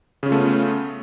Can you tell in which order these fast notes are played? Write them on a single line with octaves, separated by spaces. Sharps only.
C#3 C#4 F4 A3 B3